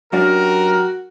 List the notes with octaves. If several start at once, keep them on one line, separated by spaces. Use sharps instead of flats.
F#2 D4 F#4 G4 A#4